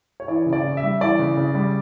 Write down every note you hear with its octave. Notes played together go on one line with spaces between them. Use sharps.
C#5
E3 D5
C#3
D5
C#3
E5
G3
E3 D5
C#3
C#3
G3